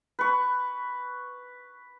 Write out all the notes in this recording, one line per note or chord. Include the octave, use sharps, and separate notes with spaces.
B4 C#6